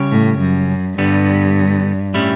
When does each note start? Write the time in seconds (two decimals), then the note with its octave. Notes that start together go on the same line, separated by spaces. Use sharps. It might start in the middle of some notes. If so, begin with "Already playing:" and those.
Already playing: C#3 G3 C#4 G4 C#5
0.11 A2
0.40 F#2
0.98 G2 D3 G3 B3
2.14 A2 G3 C#4 E4 G4